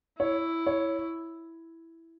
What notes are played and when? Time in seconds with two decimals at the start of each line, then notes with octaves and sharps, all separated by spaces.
0.19 E4 C#5
0.67 C#5